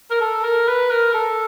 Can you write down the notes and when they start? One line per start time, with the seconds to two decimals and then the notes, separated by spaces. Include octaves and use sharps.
0.11 A#4
0.21 A4
0.44 A#4
0.68 B4
0.91 A#4
1.14 A4